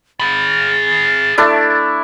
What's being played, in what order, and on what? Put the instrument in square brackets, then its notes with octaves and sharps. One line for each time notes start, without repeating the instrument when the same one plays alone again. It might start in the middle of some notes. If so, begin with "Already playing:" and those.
[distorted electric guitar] G#4 B5 [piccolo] A6
[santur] A3 D4 E4